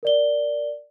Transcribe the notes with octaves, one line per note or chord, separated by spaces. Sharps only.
A#4 D5 G7